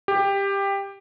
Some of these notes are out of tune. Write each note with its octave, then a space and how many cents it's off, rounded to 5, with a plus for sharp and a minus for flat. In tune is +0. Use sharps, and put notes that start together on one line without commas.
G4 +15